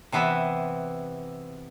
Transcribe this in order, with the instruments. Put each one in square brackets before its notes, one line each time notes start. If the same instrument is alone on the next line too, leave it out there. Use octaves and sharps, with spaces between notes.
[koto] C3 E3 B3 E4